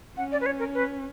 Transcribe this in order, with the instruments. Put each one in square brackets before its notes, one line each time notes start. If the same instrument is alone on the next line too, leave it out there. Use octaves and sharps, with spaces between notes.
[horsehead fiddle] C#4 [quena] F#5
[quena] D5
B4
C#5
A#4
B4